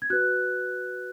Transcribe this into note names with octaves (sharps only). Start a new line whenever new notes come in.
G#6
F#4 B4 F#6